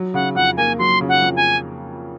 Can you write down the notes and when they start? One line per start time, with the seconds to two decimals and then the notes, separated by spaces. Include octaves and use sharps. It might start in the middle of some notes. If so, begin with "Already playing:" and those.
Already playing: F#3
0.14 C#3 F#5
0.35 F2 F#5
0.57 A#3 G#5
0.79 F#3 C6
1.01 C#3
1.09 F#5
1.22 F2
1.36 G#5